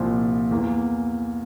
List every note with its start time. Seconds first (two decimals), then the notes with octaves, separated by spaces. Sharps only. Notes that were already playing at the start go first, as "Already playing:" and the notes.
Already playing: C2 A#2 F3
0.51 E2 E3 A#3